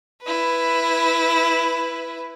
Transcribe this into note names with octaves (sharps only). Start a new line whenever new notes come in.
E4 B4